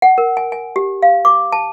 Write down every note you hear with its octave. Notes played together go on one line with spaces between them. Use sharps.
F#5
A#4
G#5
G#5
G4
F5
D6
A5